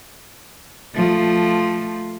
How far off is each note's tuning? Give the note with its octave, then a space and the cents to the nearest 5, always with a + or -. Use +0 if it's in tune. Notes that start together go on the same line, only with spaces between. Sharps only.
F3 +0 A3 +0